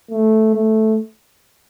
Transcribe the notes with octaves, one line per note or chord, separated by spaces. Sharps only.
A3
A3